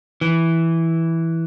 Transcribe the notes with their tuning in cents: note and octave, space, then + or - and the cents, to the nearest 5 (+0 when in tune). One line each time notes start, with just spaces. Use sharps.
E3 -5